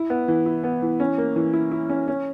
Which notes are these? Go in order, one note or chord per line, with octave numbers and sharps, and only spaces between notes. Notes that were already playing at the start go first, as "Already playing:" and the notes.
Already playing: E4
B3
E3
E4
B3
E3
C#4
A#3
E3
E4
E4
C#4
C#4